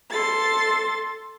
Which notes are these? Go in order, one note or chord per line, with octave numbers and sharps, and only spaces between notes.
A4 C6 A6